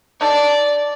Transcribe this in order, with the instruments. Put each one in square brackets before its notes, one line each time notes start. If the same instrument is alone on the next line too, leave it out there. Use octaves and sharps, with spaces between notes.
[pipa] D#4 A4 A5 [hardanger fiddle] D5